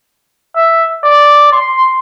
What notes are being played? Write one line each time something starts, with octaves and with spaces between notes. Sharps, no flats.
E5
D5
C6